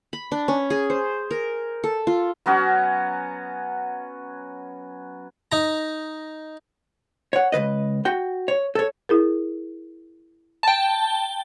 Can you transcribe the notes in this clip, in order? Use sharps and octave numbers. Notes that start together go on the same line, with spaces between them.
B5
D4
C#4
G#4
C5
A#4
A4
F4
F#3 B3 C#4 F#4
D#4 A#5
C#5 F#5
C#2 C3 B4 D#5
F#4 G5
C#5
A4 C#5
E4 G#4 A#4
G5 A5